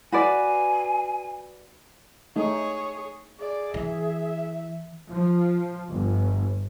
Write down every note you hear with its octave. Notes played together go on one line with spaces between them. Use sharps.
F#4 B4 D5 G#5
A3 D#4 G#4 C#5
G#4 D5
E3 E5
F3
G1